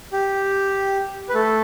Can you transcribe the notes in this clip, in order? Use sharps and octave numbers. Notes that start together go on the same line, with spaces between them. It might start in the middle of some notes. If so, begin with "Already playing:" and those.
G4
B4
A3 A4